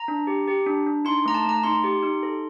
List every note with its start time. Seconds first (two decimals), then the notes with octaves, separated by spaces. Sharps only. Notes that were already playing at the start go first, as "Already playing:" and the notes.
Already playing: A#5
0.08 D4
0.27 G4
0.47 G4
0.66 D4
0.86 D4
1.05 D#4 C6
1.25 A3 A#5
1.34 A5
1.45 A3 A#5
1.64 D#4 C6
1.84 G4
2.03 D#4
2.23 A4